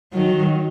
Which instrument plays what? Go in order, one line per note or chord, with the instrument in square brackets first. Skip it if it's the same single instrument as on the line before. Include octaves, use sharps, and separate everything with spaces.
[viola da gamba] D#3 F#3